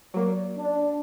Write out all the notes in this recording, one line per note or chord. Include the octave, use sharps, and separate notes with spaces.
F#3 A#3 D5
D4